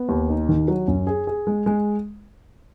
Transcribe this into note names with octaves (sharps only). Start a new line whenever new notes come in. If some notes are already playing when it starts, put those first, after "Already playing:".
Already playing: B3
D#2
D#4
D#3
F#3
F#2
G#4
G#4
G#3
G#3